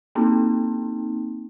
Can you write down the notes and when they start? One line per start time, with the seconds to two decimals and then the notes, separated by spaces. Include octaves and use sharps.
0.15 A#3 C4 C#4 D#4